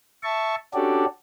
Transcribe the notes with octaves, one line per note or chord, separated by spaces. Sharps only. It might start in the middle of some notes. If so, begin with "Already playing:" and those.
E5 A5 C#6
C#4 D4 F#4 G4 A4 D5